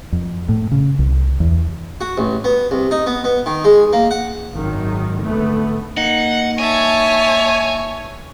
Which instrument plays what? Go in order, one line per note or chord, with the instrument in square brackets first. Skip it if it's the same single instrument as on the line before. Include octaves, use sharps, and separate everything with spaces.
[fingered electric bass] F2
A2
C#3
C2
E2
[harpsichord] F#4
A1
B3
C2
D#4
B3
B3
D#3
G#3
A#3
F#5
[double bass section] G#1 F#2 D#3 F#3
G#1 D3 A3 B3
[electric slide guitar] A#3 D#4 [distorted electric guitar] F#5
[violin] C#5 [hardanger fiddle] E5 A5 [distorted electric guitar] G#5